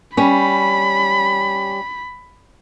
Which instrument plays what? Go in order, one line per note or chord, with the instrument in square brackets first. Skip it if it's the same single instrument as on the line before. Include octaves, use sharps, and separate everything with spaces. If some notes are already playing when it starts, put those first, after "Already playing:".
[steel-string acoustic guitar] G3 C#4 [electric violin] B5